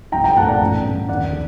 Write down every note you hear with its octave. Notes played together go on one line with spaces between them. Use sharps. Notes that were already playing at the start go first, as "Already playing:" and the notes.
C2 G5 A#5
G5 A#5
A#2 A3 C4 F#5 A5
D5 F#5
A1
G2 D3
D#2 D5 F#5
D3